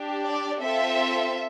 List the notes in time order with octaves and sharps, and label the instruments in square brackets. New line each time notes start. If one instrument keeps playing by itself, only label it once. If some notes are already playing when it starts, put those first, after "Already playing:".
Already playing: [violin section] D4 G4
D5
C4 F4 A4 E5